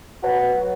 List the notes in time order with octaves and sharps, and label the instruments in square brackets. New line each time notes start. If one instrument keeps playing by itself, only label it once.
[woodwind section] F#4 [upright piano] B4
[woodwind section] F#3